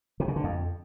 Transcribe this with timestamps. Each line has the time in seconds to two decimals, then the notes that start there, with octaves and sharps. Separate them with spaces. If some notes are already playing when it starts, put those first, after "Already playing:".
0.20 C3
0.28 C#3
0.36 D3
0.44 F2